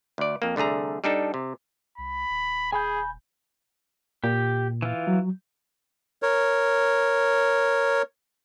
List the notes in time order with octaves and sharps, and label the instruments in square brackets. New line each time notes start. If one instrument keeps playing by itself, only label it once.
[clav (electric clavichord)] D2 D5
F2 A#3
C2 D3 A3 G#4 A#5
G3 D4 D#4 A4
C3
[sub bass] C2 [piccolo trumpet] B5
[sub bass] D#1
[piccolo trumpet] G#4 [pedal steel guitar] G#5 B5 G6
[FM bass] A#2 [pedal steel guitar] G4
[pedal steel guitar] E3 F4
[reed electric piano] F#3
[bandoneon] A#4 C#5